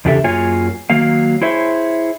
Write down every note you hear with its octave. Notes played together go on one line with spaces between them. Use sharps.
E2 C#3 D4 G4 A4 E5
F#2 A#3 F4 G#4 C#5 G#5
D#3 F#3 A#3 F5
E4 G#4 C5 C#5 E5